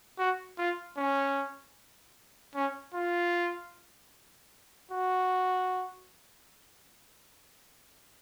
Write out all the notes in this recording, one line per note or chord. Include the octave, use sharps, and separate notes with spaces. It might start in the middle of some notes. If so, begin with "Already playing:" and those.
F#4
F4
C#4
C#4
F4
F#4